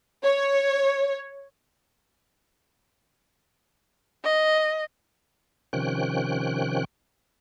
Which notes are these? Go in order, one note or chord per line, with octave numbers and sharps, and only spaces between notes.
C#5
D#5
C3 D#3 F3 C#4 G5 F#6